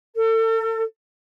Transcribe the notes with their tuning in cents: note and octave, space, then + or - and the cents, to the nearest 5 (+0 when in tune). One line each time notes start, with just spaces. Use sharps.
A4 +35